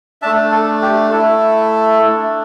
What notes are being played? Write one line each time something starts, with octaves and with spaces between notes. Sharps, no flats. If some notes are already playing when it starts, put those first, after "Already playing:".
A3 D4 E5 A5
A4
G4
A3 E4 A4
A3 D4